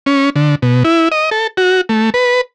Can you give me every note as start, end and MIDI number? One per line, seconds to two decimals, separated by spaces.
0.06 0.30 61
0.36 0.55 50
0.62 0.83 47
0.85 1.09 64
1.12 1.30 75
1.31 1.47 69
1.57 1.81 66
1.89 2.10 57
2.14 2.41 71